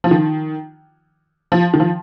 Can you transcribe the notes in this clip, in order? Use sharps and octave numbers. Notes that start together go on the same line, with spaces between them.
F3
D#3
F3
D#3
F3